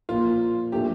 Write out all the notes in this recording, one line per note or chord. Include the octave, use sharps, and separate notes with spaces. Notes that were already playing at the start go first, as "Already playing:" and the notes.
A#2 F3 A#3 F4
A#2 F3 A3 D4 G4